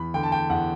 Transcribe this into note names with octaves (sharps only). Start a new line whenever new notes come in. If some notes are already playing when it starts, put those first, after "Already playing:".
Already playing: E2 B5
D3 G5
A5
G5
E2 F#5